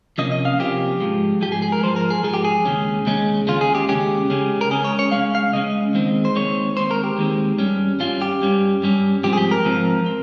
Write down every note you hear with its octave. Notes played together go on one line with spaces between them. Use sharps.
C3 F3 A#3 C#4 D#5
D#5
F5
C3 F3 A#3 C#4 G4
G#2 F3 G#3
G#2 F3 G#3 G4
G#4
G#4
A#4
G#2 F3 G#3 C5
A#4
G#4
G#2 F3 G#3 G#4
G4
G#4
D#2 C#3 G#3 C#4
D#2 C#3 G#3 C#4
D#2 C#3 G#3 C#4 F4
G#4
G4
D#2 C#3 G#3 C#4 G4
C#2 C#3 G#3 C#4
A#4
C#2 C#3 G#3 C#4 G#4
C#5
C#5
C#2 C#3 G#3 C#4 F5
F5
C#2 C#3 G#3 C#4 D#5
D#2 D#3 G#3 C4
C5
D#2 D#3 G#3 C4 C#5
D#2 D#3 G#3 C4 C5
A#4
G4
D#2 D#3 G#3 C4
G2 G3 C#4
G2 G3 C#4 F4
G4
G2 G3 C#4
G2 G3 C#4
G#2 F3 C4 G4
G#4
G4
A#4
G#2 F3 C4
C4